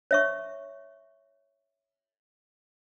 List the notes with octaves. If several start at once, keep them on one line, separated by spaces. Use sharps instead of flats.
C#5 E5 C#6